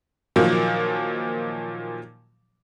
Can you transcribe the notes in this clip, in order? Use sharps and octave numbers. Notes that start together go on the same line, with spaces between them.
A#2 D#3 F3 F#3 A#3